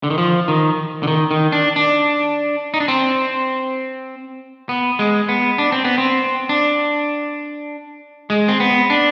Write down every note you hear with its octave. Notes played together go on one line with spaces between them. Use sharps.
D3
D#3
F3
D#3
D3
D#3
D#3
D4
D4
D#4
D4
C4
B3
G#3
B3
D4
C4
B3
C4
D4
G#3
C4
B3
D4